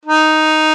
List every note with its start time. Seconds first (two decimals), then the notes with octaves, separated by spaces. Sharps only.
0.05 D#4